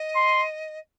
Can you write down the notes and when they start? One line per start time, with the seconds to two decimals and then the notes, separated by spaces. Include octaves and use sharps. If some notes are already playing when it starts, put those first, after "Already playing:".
Already playing: D#5
0.16 C6